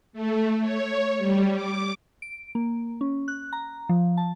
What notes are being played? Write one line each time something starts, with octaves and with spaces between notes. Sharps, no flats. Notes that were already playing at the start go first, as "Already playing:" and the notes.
A3
C#5
G3
D6
D7
A#3
C#4
F#6
A#5
F3
A5